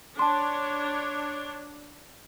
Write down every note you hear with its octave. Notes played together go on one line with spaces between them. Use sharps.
D4 C#5 A5 C6